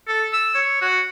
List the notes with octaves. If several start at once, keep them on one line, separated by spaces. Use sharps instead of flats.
A4
E6
C#5
F#4